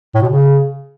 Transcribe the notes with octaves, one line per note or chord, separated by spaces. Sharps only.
A2
B2
C#3